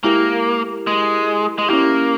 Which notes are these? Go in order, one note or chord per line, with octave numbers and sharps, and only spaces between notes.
G#3 A#3 E4 G4 A#4
G#3
G#3
A#3 C#4 E4 G4